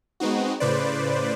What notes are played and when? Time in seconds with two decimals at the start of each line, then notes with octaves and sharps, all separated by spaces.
0.20 G#3 B3 C4 D#4 F#4
0.60 A2 C#3 B4 C5 D5